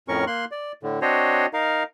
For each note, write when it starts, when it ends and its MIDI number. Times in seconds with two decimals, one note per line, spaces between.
0.08 0.25 41
0.08 0.25 45
0.08 0.25 61
0.08 0.25 70
0.08 0.25 85
0.27 0.45 58
0.27 0.45 84
0.27 0.45 90
0.51 0.72 74
0.83 0.99 45
0.83 0.99 50
1.02 1.46 60
1.02 1.46 62
1.02 1.46 66
1.02 1.46 72
1.02 1.46 73
1.02 1.46 75
1.53 1.83 63
1.53 1.83 70
1.53 1.83 77